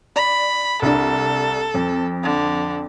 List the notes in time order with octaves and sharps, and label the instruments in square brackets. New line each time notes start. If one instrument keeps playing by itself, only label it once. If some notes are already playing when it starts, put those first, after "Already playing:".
[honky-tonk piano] D5 [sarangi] B5
[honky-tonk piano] C2 D4 [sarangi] A4
[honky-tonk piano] F2
[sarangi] D3